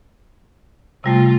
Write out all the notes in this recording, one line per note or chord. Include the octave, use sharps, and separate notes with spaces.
C3 G3 A3 F4